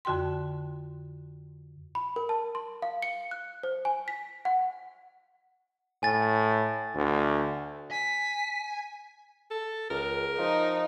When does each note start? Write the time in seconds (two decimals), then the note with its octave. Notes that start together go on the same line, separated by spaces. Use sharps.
0.05 F2 D3 F#4 G5 C6
1.95 B5
2.16 A#4
2.29 A5
2.55 C6
2.82 F5
3.03 C#7
3.31 F#6
3.63 C5
3.85 G#5
4.08 B6
4.45 F#5
6.03 A2 G#5 A6
6.95 D2
7.91 G#5 B6
9.51 A4
9.90 C#2 A#4
10.38 F3 D#4